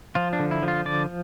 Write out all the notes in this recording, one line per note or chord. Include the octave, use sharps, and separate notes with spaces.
F3 F4
D4
D3
E4
F3
F4
D3 D5